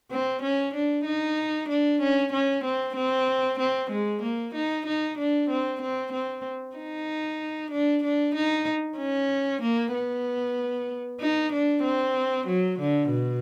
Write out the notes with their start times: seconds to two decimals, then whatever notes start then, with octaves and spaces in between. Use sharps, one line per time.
0.11 C4
0.43 C#4
0.74 D4
1.06 D#4
1.69 D4
2.02 C#4
2.33 C#4
2.64 C4
2.96 C4
3.60 C4
3.91 G#3
4.23 A#3
4.55 D#4
4.86 D#4
5.19 D4
5.50 C4
5.82 C4
6.13 C4
6.76 D#4
7.71 D4
8.04 D4
8.35 D#4
8.98 C#4
9.62 A#3
9.94 B3
11.20 D#4
11.53 D4
11.84 C4
12.47 F#3
12.79 D3
13.11 B2